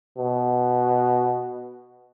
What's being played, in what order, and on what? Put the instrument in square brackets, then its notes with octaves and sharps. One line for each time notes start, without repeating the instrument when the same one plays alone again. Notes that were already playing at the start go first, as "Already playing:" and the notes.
[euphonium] B2